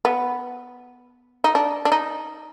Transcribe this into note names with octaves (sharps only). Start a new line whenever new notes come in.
B3
D#4
D4
D4
D#4